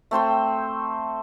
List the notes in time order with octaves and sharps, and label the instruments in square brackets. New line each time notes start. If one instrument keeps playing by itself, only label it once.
[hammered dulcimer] A3 C4 C5 G5